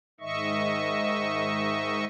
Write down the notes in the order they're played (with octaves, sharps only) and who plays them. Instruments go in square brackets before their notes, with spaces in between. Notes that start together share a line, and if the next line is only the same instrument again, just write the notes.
[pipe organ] G#2 D#3 D#5 E5 C#6